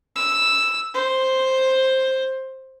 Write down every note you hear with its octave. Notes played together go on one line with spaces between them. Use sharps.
E6
C5